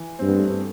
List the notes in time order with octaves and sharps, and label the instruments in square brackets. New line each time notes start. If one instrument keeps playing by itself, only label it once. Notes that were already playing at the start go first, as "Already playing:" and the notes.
Already playing: [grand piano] E3
[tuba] G2 [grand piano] C4
[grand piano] B3
A3
G3